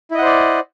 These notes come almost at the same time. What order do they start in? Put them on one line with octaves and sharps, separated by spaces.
E4 D#5 F#5 C5 D5